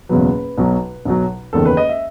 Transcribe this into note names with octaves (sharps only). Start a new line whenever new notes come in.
F#1 E2 B2 F#3 B4
B1 B2 F#3
B1 B2 F#3
F#1 E2 D#3 A4
B4
D#5
E5